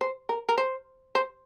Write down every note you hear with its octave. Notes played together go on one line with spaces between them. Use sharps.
C5
A#4
A#4
C5
C5